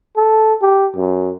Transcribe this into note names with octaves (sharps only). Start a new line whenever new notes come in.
A4
G4
F#2